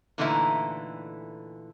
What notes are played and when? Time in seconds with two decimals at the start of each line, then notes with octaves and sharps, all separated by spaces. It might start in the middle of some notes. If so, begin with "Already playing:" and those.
0.18 A#2 D3 E3 A3 D#4 E4